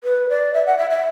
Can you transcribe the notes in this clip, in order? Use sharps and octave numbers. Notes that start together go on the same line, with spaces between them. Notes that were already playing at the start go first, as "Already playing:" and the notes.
B4
D5
E5
F#5
E5
E5